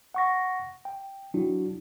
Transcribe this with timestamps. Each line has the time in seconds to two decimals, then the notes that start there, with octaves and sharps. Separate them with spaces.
0.14 F#5 C#6 A#6
0.85 G5
1.34 F#3 D4 E4 F#4